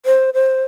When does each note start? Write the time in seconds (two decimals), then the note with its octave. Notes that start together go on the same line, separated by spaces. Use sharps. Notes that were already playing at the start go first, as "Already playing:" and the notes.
0.06 C5
0.34 C5